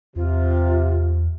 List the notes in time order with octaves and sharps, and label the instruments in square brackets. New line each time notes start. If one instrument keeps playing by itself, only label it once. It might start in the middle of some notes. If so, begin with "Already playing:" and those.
[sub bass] E2 [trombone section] C3 [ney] F4